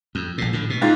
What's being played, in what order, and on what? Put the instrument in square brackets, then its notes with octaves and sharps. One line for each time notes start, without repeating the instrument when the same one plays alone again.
[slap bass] F2
A#1 A2
A2 D3
B2
[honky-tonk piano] G#2 F4 A6